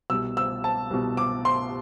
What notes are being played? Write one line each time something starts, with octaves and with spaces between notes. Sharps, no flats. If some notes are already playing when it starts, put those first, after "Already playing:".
C2 B2 E6
E6
A5
C2 B2
D6
C6